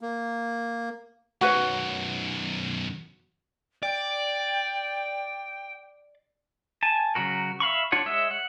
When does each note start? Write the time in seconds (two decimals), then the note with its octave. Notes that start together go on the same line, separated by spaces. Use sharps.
0.01 A#3
1.41 B1 F#2 F#4 B4 C#5 F#5
3.83 D5 G5
6.83 G#5 A5
7.15 C#3 F#3 F#4 A#4
7.60 E5 F5 B5 C#6
7.92 D4 F4 C#5 F#5
8.06 G#3 C#5 E5
8.31 F#5